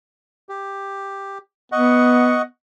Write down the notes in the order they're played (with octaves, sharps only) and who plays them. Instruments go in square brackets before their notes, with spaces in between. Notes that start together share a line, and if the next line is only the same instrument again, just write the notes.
[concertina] G4
[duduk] B3 [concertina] D#5 F#5 C#6